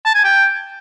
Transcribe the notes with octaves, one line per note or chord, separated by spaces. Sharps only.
A5
G#5
G5